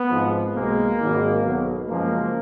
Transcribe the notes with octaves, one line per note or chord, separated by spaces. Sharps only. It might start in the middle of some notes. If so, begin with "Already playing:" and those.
Already playing: B3
G#1 G#2 F3
B1 B2 G#3 A#3
G#1 G#2 D#3 F#3
B1 B2 F#3
F#2 C#3 F3 G#3 A#3